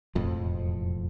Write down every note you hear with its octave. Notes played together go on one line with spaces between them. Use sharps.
E1 F2 A2 F3